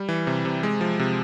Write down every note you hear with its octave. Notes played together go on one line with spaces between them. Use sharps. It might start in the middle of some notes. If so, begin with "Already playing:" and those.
Already playing: G3
E3
C3
C3
G#3
F3
C3